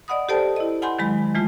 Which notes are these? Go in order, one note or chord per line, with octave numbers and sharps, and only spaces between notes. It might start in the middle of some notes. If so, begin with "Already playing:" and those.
D5 D#5 F#5 B5 D#6
G4 A4 C5 D5 G5 A5
E4 D#5
F#5 G#5 B5 C6 G6
D#3 F#3 G#3 B5
E3 G#3 A3 F4